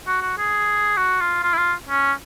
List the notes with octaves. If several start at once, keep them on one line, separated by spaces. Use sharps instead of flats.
F#4
F#4
G#4
F#4
F4
F4
E4
F4
C#4